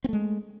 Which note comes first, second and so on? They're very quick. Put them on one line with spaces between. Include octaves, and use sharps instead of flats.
C4 A3 G#3